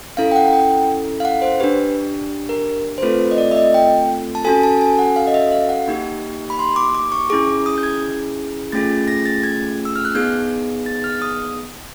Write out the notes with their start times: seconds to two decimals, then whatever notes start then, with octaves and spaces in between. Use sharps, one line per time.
0.17 C#4 E4 A4 F5
0.32 G5
0.36 F#5
0.48 F#5
0.53 G5
1.20 F5
1.25 F#5
1.42 C5
1.60 D4 G4 B4
2.49 A#4
2.98 C5
3.03 A3 C4 F4 A4 B4
3.31 D#5
3.38 D5
3.51 E5
3.56 D#5
3.74 G5
4.35 A5
4.44 C#4 F#4 A4 G#5
4.63 A5
4.81 G#5
4.99 F#5
5.16 F5
5.27 D#5
5.34 E5
5.52 F5
5.69 F#5
5.88 A#3 D#4 G4
6.50 B5
6.59 C6
6.76 D6
6.95 D6
7.12 C#6
7.30 C#4 E4 G#4 D6
7.66 D#6
7.78 G6
7.83 G#6
8.72 A3 C#4 F4 G#4 A6
9.08 A#6
9.26 A6
9.43 G#6
9.85 E6
9.96 F6
10.05 F#6
10.15 B3 D#4 G#4 G6
10.86 A6
11.04 F6
11.22 D#6